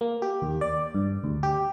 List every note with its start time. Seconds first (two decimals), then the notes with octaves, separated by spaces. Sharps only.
0.01 A#3
0.22 G4
0.42 D#2
0.61 D5
0.95 G2
1.24 D2
1.43 G4